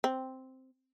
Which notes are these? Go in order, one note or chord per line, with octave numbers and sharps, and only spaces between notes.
C4